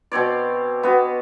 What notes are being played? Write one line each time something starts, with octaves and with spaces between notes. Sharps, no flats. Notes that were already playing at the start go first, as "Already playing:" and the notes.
B2 C4 C#5 D5
B3 F#4